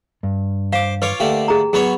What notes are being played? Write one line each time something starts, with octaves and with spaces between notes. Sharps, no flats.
G2
C5 F5 D6
F4 B4 C#5 D6
D3 A3 A#3 G4
G#4 A#5
F#3 B3 G#4 C#5 B5